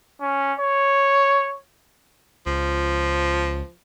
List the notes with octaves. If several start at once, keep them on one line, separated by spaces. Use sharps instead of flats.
C#4
C#5
C#2 F3